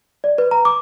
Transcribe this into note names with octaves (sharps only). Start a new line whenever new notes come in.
D5
B4
A#5
D6